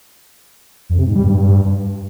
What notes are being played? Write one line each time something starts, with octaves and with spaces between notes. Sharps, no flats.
F2
C3
G#2
G3
G2